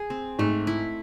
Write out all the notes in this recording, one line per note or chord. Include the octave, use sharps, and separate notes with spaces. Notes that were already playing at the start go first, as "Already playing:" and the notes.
Already playing: G#4
C4
G#2 A3
E4